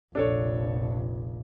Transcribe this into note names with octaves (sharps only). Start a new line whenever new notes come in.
F1 A#1 D4 A4 C#5